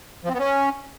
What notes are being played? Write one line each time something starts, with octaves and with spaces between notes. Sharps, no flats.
F3
C4
B3
C#4